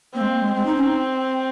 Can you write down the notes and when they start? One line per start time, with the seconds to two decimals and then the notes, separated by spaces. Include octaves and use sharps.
0.15 A#3 C4
0.21 G#3
0.29 A#3
0.41 G#3
0.55 G#3 C4
0.66 D#4
0.76 C#4
0.86 D#4